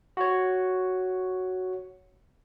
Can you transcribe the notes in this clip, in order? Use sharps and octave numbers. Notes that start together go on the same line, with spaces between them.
F#4 C#5